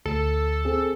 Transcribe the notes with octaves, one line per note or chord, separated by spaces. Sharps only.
D2 A4
C4 G#4